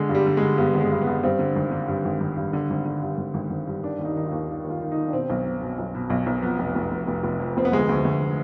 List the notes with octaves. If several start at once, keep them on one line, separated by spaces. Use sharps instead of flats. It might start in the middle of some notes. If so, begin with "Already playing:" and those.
Already playing: D3 G#3
G2
G3
D3
G#3
D3
G2 B3
G#1
G#3
G2
B3
G2
G2 C4
D3
G#1
D3
G2
G#1
G#1
G2
D3
G#1
D3
G2
G#1
G#1
G#1
G2
D#3 D4
D#2
D#4
D#3 D#4
D#2 F4
D#3
D#2
F4
D#3
D#4
D#3
D4
B2 C4
B1
B2
B2
B1
B2
B1
B1
F2 B3
F1
F1
F1
F1
F1
F2
F1 C4
B3
D2 G#3
D2
D2